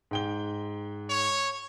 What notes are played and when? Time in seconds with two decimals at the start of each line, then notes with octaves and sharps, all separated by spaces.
0.11 G#2 G5 G7
1.10 C#5